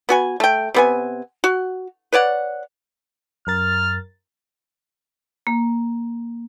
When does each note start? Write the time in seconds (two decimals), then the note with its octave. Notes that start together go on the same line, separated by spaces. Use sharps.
0.09 B3 F#4 G#5
0.40 A3 G5
0.74 C3 B3 G#5
1.44 F#4
2.12 B4 C#5 D5 F#5
3.47 F#2 A#4 F6 A6
5.47 A#3